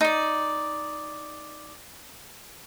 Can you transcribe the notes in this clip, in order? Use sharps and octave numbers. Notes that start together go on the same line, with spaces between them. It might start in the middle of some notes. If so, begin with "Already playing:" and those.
D#4 D5